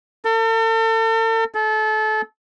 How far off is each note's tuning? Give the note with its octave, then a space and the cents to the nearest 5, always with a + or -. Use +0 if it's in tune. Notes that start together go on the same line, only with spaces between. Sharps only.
A4 +40
A4 -30